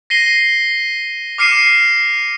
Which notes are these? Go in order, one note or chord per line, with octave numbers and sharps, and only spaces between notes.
A#6 C7 D#7 G7
D6 F6 C7 C#7 D#7 E7